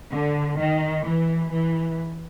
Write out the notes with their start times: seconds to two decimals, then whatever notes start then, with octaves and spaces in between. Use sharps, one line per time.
0.10 D3
0.57 D#3
1.05 E3
1.52 E3